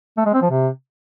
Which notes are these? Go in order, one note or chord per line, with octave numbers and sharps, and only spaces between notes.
A3
G#3
C4
F3
C3